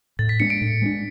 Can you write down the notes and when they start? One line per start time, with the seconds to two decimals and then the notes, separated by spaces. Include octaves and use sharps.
0.19 A2 A6
0.29 B6
0.40 G#3 B3 D4 C#7
0.50 D7
0.61 A2
0.82 G#3 B3 D4